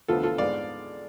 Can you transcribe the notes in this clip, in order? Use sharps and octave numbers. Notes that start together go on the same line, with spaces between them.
D2 D3 F3 B3 F4 A4
F4 A4
G#2 G#3 B3 D5 F5